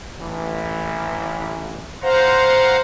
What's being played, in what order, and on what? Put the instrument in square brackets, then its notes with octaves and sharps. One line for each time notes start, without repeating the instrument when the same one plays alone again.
[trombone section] A1 E3
[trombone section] C5 [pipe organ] F5 F#5 A#5